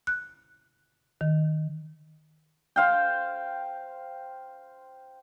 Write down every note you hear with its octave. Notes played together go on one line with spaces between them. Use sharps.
F#6
D#3
C5 F5 G5